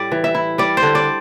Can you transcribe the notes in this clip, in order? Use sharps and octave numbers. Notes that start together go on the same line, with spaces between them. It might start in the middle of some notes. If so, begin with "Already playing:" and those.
Already playing: A2 G3 D5
E3
E5
E4
G3 D5
C5
D3
D5